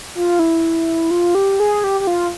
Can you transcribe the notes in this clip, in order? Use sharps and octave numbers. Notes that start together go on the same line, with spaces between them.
F4
E4
F4
G4
G#4
G4
G4
F4